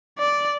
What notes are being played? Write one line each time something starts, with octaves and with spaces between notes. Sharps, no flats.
D5